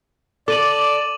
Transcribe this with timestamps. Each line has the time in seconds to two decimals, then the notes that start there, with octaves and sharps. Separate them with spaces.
0.48 A4 D5 D6 D#7 F#7